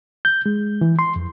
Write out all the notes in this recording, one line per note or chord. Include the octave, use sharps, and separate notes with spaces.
G6
G#3
E3
C6
F2